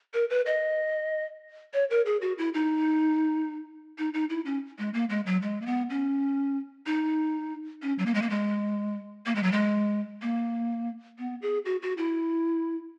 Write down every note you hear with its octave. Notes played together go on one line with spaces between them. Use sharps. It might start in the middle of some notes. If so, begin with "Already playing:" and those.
A#4
B4
D#5
C#5
A#4
G#4
F#4
E4
D#4
D#4
D#4
E4
C#4
G#3
A#3
G#3
F#3
G#3
A#3
B3
C#4
D#4
C#4
F#3
A#3
G#3
A#3
G#3
A#3
G#3
F#3
G#3
A#3
B3
G#4
F#4
F#4
E4